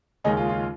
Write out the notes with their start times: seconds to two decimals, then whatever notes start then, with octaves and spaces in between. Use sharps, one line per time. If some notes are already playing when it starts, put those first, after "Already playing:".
0.24 D#2 C#3 G#3 C#4 D#4
0.37 F4
0.49 F4